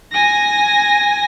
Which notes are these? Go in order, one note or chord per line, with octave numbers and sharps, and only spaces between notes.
G#5 A#6